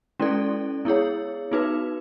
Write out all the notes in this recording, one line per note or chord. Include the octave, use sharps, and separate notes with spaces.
G#3 C#4 E4 A4 D5
B3 E4 G#4 C#5
B3 D#4 F#4 B4